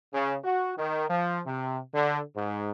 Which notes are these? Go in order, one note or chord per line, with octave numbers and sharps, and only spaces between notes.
C#3
F#4
D#3
F3
C3
D3
G#2